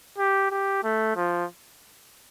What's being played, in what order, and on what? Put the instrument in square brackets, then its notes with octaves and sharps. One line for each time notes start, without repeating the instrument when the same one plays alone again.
[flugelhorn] G4
G4
A3
F3